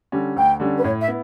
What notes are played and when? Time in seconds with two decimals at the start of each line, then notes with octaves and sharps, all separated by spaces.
0.12 D3 G3 C#4
0.36 D2 G5
0.60 D3 G3 C#4
0.77 B4
0.84 A2 C#5
1.01 E5
1.08 B3 E4